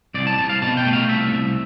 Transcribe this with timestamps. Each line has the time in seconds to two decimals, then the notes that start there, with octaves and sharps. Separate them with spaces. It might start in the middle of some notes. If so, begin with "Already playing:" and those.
0.14 C2 D5
0.27 A5
0.38 C2 A5
0.49 F5
0.62 B2 A5
0.77 G5
0.85 A3
0.93 F5
1.09 C2 E5
1.32 C2